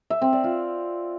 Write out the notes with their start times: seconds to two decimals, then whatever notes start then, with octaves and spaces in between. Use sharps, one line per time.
0.10 E5
0.22 C4
0.33 D5
0.44 F4